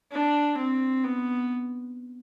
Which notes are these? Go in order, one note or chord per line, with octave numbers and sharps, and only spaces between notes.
D4
C4
B3